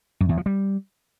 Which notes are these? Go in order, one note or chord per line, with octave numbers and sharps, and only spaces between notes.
F#2
E2
F3
G3